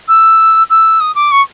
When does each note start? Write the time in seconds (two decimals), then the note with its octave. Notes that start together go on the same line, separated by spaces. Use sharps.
0.08 E6
0.70 E6
1.00 D#6
1.15 D6
1.31 C#6